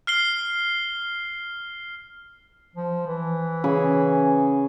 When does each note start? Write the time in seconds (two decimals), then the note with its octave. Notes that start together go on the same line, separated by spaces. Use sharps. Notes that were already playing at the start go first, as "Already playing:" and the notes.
0.07 F6 C7 G7
2.75 F3
3.07 E3
3.64 C#3 G#4 B5